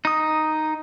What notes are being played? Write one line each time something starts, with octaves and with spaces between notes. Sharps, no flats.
D#4 D#6